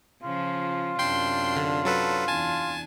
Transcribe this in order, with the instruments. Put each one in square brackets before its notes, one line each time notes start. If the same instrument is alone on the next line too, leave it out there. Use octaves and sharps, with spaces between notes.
[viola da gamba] C#3 F3 [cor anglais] F4
[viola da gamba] F#2 C3 D4 [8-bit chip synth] G5 C6 C7
[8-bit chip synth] D3
F#3 A4 B4
[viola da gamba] E2 D4 [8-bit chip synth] G#5 A5